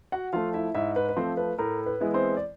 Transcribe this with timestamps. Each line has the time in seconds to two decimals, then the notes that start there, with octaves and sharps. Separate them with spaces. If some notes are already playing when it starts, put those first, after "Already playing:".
0.12 F#4 F#5
0.33 F3 A3 F4 F5
0.54 E4 E5
0.75 G#2 E4 E5
0.96 B4
1.09 B4
1.16 F3 A3 C4 C5
1.37 B4
1.58 A2 A#4
1.86 B4
2.00 E3 G#3 B3 E4
2.14 C4 C5
2.37 D5